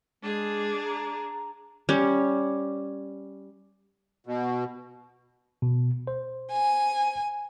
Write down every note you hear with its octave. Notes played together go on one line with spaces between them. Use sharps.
G#3 D4 G#4
A#5
G3 C#4
B2
B2
C5
G#5